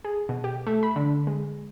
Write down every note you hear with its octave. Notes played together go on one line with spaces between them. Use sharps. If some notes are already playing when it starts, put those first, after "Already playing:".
G#4
B2
G4
A3
B5
D3
G#3